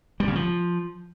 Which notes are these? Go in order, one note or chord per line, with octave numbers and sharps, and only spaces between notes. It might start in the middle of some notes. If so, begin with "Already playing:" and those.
G3
C#3
F3